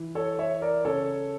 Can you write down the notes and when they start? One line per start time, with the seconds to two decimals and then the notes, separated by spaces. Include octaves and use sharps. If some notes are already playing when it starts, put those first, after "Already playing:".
Already playing: E3
0.15 A4 C#5
0.38 E3 C#5 E5
0.62 A#4 D5
0.85 C#3 A4 C#5